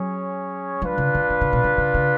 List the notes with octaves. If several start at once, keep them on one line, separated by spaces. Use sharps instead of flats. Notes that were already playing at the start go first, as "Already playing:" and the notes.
Already playing: F#3 C#4 G#4 C#5
F3 D4 F4 B4
C#3
D3
D3
C#3
B2
C#3
C#3
C#3